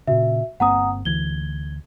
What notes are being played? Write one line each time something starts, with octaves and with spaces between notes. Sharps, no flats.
A#2 C#3 F#4 E5
G1 A#3 C4 F#5 A#5 D#6
D2 E3 G#6 G7